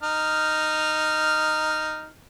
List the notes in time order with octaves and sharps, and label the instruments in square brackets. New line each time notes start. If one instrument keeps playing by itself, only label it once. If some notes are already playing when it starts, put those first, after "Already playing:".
[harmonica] D#4 F6